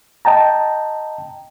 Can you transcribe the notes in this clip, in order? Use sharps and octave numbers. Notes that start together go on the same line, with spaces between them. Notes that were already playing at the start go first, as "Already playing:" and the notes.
D#5 G5 A5 A#5